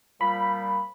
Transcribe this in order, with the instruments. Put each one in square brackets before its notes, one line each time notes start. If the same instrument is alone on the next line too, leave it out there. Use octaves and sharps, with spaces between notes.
[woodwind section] A#2 F3 G3 [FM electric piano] B5